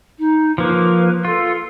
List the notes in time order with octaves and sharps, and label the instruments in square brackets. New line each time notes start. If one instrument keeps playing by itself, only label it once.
[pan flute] D#4
[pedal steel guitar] F3 A#3 [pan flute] B4
[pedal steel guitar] F4 [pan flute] A4